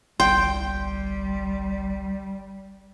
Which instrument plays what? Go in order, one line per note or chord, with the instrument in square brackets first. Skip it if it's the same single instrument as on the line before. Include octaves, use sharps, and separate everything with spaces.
[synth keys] G1 C2 [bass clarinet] G3 [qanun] G5 [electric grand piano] C6